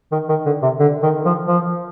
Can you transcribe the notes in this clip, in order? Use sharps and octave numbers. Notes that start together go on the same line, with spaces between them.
D#3
D#3
D3
C3
D3
D#3
F3
F3